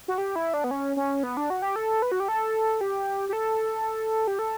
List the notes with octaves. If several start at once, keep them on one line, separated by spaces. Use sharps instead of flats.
F#4
G4
E4
D4
B3
C#4
C#4
B3
D4
F#4
G4
A4
B4
F#4
G4
A4
G4
G4
A4
G4
A4